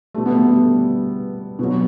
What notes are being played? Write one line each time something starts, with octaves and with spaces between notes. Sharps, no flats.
B2 G3 A3
B3
A3
G3
B2 F#3